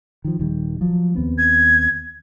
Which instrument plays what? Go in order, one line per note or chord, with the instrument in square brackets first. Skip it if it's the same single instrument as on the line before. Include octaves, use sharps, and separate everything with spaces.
[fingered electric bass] D#3 F3
D#1 D#3 G3
F3 F#3
D#2 B3 C4
[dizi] G#6